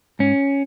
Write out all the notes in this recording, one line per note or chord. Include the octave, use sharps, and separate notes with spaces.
G#2 C#4